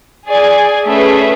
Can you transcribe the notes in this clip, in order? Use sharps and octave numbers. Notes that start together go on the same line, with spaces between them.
G#4 D5 G#5
A3 C#4 G#4 B4 E5